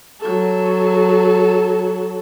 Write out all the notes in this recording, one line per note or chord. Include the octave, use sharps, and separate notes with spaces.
F#3 A4